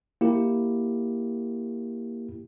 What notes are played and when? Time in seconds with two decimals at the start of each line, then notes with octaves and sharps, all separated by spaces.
0.21 A#3 E4 G4